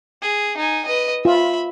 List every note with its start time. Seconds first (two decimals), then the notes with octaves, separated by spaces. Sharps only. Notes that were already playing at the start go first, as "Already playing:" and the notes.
0.22 G#4
0.57 D#4 G#5
0.86 B4 D#5
1.25 F4 E5 B5